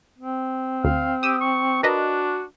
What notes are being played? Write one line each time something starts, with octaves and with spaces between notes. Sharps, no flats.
C4
D2 F5
G4 D#6 E6
C#6
D4 F#4 A#4 B4 D#5